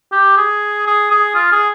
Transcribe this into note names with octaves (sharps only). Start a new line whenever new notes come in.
G4
G#4
G#4
G#4
F4
G#4